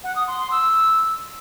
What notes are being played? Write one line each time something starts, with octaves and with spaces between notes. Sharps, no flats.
F#5
D#6
C6
C6
E6